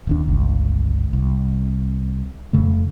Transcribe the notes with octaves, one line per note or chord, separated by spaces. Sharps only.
D1 D#2 D4
G1 C#2
C2
D#1 F2 C#3 A3